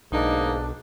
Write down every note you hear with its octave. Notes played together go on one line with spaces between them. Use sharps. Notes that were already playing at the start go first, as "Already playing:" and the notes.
B1 G#2 A#3 D4 D#4